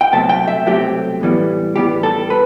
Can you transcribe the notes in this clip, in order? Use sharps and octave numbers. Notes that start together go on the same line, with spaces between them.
G5
C2 B2 F#3 A3 C4 A5
G5
E5
C2 B2 F#3 A3 C4 G4
A2 E3 G3 B3
A2 E3 G3 B3 G4
A4
B4